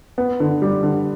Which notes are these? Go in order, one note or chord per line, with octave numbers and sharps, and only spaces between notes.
B3
D3
G3
D3